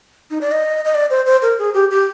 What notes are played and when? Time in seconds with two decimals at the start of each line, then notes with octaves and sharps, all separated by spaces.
0.31 D#4
0.41 D5
0.52 D#5
0.85 D#5
0.95 D5
1.10 C5
1.26 C5
1.42 A#4
1.59 G#4
1.74 G4
1.91 G4